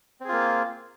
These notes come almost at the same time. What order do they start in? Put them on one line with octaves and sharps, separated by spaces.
C4 G#4 F4 A#3